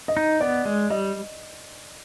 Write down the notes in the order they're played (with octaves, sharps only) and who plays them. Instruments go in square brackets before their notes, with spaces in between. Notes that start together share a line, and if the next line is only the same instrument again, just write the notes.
[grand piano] D#5
[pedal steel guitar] D#4
[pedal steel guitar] B3 [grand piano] D5
[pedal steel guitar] G#3
[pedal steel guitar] G3 [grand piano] D#5